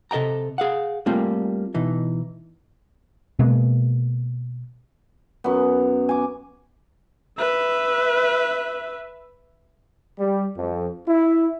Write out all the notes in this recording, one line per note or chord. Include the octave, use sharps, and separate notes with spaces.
C3 A4 D#5 G5 A#5
G#4 F5 F#5
G3 A3 A#3 C4 F4
B2 E3 D#4
B2 G#3 A#3
F#2 B3
G#5 D6
B4 E5
G3
F2
E4